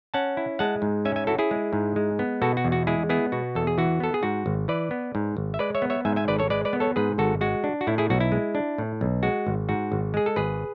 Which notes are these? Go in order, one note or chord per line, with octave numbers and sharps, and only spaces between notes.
C#4 F#5 A5
E4
G#3 F#5 A5
G#2
C#4 E5 G#5
E5 G#5
E4 F#4 A4
E4 G#4
G#3
G#2
G#3
B3
B2 F#4 A4
F#4
E2
F#4
G#3 E4 G#4
B3 E4 G#4
B2 F#4
E2 A4
G#4
E3 F#4
B3 A4
G#4
G#2 F#4
G#1
E3 B4 D5
B3
G#2
G#1
E5
G#3 B4 D5
C#5 E5
B3
C#5 E5
G#2 E5 G#5
E5 G#5
G#1 B4 D5
A4 C#5
G#3 B4 D5
B4 D5
B3
A4 C#5
G#2 G#4 B4
G#1 F#4 A4
G#3 F#4
D4
F#4
A2 E4
E4 G#4
B1 F#4
E4
G#3
D4
A2
B1
G#3 F#4
G#1
G#2 F#4
G#1
G#3 G#4
A4
G#1 G#4 B4